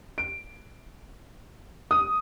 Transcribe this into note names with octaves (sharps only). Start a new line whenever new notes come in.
D7
D#6